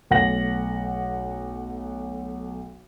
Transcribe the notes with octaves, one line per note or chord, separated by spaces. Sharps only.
B1 A3 F#5 A#6 F#7